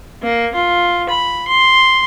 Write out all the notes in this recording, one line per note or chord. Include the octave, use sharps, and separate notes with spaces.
A#3
F4
B5
C6